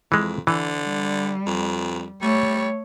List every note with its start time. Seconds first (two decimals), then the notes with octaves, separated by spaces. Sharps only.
0.12 F2 E3 G#3
0.47 D3 E3
0.84 G3
1.47 F2
2.22 G3 A3 C#5